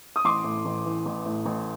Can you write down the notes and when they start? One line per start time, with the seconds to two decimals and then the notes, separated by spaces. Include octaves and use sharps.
0.16 D#6
0.25 A1 C6 D6
0.44 A2
0.65 A1
0.86 E3
1.06 A1
1.25 A2
1.45 A1